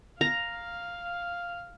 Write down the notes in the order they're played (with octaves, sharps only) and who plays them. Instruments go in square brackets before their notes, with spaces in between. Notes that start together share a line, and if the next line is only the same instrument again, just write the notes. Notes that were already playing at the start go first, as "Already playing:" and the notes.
[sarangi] F5 [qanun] A#5